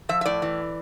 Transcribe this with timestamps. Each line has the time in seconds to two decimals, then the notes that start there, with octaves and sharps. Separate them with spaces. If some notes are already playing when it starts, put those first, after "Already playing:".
0.09 F3 E5
0.21 E5
0.26 A2 D5
0.42 E3